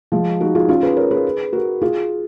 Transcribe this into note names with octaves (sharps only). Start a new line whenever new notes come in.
F3 G#3
D#4 F#4
F4 G#4
C#4 F4
G#4 B4
A#4 C#5
G#4 B4
F#4 A#4
F4 G#4